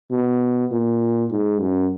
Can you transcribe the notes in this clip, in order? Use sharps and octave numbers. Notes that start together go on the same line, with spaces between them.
B2
A#2
G#2
F#2